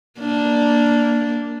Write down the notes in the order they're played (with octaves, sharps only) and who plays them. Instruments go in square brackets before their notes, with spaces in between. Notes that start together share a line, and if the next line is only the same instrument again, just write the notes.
[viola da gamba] A#3 D4